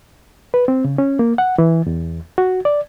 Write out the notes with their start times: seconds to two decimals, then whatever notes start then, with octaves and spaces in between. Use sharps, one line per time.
0.54 B4
0.68 C4
0.84 C#3
0.98 C#4
1.19 A#3
1.38 F#5
1.58 E3
1.86 E2
2.38 F#4
2.65 D5